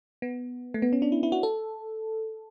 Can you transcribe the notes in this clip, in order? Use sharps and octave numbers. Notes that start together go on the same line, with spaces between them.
B3
A3
B3
C#4
D4
E4
E4
F#4
A4